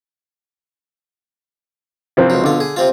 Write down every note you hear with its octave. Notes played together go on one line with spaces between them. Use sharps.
C2 F3 C4
C#2 F#3
B1 D3 F4
G#4
C3 C4 F4